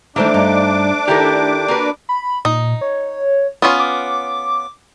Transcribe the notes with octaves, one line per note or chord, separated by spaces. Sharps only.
D#3 E3 A3 D4 C5 E5 D6
G2 D#4
D#3 E4 G4 A4 A#4
A#3 F#4 B4
B5
A#2 D#4
C#5
B3 C#4 F4
D6